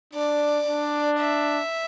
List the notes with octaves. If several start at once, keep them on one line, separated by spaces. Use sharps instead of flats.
D4 D5
D4
E5